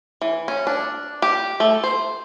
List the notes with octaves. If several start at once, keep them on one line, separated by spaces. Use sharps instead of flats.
E3
C#4
D4
G4
A3
C5